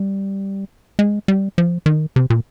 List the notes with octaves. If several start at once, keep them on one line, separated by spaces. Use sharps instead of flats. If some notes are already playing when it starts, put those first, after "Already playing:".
Already playing: G3
G#3
G3
F3
D#3
C3
A#2